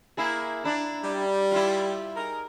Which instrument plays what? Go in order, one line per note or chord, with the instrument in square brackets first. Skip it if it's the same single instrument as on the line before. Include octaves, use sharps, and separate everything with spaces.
[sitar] A#3 E4 G#4
D4 E4
[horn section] G3
[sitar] E4 F4
[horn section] D#4 G#4 A#4